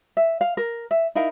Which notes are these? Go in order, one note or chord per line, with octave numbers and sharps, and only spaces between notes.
E5
F5
A#4
E5
D#4 E4 A#4 F5